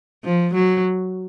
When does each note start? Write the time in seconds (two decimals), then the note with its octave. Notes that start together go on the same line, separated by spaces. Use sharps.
0.25 F3
0.54 F#3